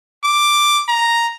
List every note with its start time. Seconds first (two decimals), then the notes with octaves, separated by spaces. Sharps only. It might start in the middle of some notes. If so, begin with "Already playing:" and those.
0.24 D6
0.88 A#5